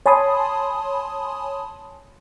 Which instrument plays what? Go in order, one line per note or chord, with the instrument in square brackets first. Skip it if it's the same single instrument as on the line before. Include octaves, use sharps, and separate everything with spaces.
[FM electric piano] C#5 G#5 A5 B5 C6 D#6